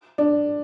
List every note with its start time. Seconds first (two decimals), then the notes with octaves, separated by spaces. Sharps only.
0.18 D4